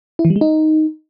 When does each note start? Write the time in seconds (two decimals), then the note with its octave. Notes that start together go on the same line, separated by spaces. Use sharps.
0.19 E4
0.25 E3
0.30 G3
0.36 G#3
0.41 D#4